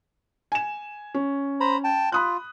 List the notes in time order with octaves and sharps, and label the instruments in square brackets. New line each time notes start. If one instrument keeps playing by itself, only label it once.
[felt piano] G#5 E7
C#4
[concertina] C5 A#5 B5
G5 A5
[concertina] F4 [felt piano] B5 D#6 F#6